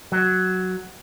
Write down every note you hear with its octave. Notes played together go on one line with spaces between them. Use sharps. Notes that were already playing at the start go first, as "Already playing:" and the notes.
F#3